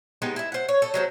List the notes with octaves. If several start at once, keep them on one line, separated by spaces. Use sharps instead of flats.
G#3 B3 D#4 G4
E4 E5
C5 F#5
C#5
A4 D#5
F#3 G#3 C4